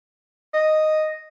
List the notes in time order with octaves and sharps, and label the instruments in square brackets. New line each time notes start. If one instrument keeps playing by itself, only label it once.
[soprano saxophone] D#5